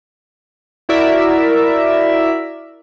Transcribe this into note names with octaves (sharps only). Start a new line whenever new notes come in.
E4 F#4 A#4 D5 E5